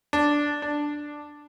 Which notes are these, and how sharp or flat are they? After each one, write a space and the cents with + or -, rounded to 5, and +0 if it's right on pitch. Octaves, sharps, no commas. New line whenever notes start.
D4 +0
D4 +5